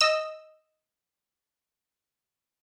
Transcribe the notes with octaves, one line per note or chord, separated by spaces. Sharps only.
D#5 E6